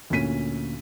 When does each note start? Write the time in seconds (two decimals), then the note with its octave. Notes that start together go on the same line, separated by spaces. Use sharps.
0.10 D2 A#2 C#4 B6 D#7